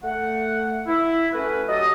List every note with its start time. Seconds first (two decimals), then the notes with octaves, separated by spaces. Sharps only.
0.03 A3 F#5
0.87 E4
1.33 A3 C#4 F#4 B4
1.68 F#3 G4 A4 D#5